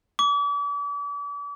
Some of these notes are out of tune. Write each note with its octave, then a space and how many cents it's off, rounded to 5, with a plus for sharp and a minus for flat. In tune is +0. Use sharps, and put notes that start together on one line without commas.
D6 -40